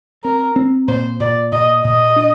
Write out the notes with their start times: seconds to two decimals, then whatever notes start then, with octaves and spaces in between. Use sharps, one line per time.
0.24 C4 A#4
0.56 C4
0.88 A#2 C5
1.20 A#2 D5
1.52 A#2 D#5
1.84 A#2 D#5
2.16 D4